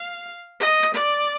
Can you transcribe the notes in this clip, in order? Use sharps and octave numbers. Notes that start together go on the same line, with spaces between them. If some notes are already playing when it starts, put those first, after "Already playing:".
Already playing: F5
D#5
D5